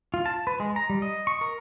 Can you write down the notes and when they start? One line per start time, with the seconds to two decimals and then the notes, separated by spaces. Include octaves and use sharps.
0.14 F4
0.26 A5
0.47 B4
0.60 G#3
0.76 A#5
0.90 G3
1.02 D#5
1.27 C#6
1.41 A#4